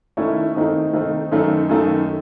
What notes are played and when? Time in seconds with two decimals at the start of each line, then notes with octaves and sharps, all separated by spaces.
0.17 D#3 A3 C#4 E4 A4
0.55 D#3 A3 C4 D#4
0.93 D#3 A3 C4 D#4
1.32 F#2 D#3 A3
1.69 F#2 D#3 A3